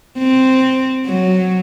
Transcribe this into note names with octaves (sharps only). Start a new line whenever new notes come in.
C4
F#3